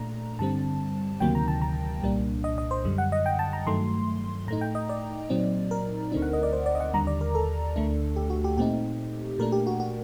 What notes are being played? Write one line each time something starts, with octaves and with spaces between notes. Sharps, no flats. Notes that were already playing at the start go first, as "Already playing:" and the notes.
Already playing: A#2 A3 D4 A#5
G2 D3 G3 C4 A5
D2 C3 D#3 F#3 A#3 G5
A#5
A5
A#5
C2 A#2 G3 A#3 D4
D#5
D#5
C5
F#2 D3 G3
F#5
D#5
G5
A5
A#5
G2 D#3 F#3 A3 C6
A2 A3 D#4 A#5
G5
D#5
D5
A#2 F#3 C4 D#4
A#4
D2 D3 A3 C4 D#4
F#5
D#5
D5
C5
D5
D#5
F#5
D#2 D3 G3 A#5
D5
A#4
A4
D2 D3 A3 D4
G4
F#4
G4
A#2 A3 C4 D#4 G4
A#2 A3 D4 A#4
G4
F#4
F#4